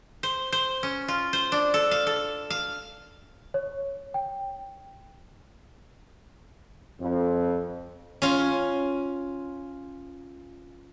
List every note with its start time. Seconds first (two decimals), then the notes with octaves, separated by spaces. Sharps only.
0.23 C5
0.52 C5
0.83 C#4
1.08 F4
1.33 C5
1.52 D4
1.74 A4
1.91 F5
2.07 A4
2.50 F5
3.54 C#5
4.14 G5
7.01 F2
8.22 C#4 F4